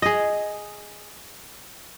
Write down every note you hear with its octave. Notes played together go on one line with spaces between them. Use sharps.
G#4 D#5